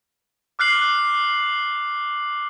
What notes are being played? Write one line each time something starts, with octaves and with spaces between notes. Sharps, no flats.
D6 F6 F#6 C7 F#7